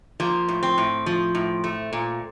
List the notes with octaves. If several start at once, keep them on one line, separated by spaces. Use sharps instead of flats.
F3 A#3
A2
C4
A2
F3
A2
A3
A#2